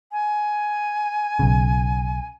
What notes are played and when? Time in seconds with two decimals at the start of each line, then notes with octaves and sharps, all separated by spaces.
0.12 G#5
1.39 B1 C#3